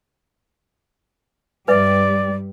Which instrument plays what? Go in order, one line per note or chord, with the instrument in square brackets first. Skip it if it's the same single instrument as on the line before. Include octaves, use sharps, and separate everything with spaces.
[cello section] G2 G3 [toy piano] B4 E5 [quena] D5